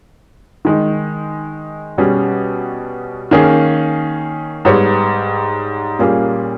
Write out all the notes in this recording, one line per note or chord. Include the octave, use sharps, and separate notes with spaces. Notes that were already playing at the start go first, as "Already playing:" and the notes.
D#3 G#3 D#4
B2 G3 C#4 G#4
D#3 A#3 C#4 G#4
G#2 G3 B3 G4 C#5
A#2 G3 A#3 C#4 G#4